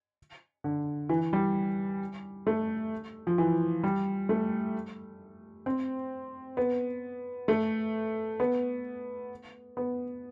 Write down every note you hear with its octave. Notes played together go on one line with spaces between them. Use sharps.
D3
E3
G3
A3
F3
E3
G3
A3
C4
B3
A3
B3
B3